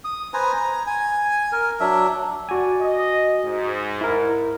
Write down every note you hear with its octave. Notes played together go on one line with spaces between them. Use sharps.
D#6
B4 C5 G#5 A#5
A#5
G#5
A#4
F#3 D4 E5
F#4 D5 G#5
D#5
G#2
E4 A#4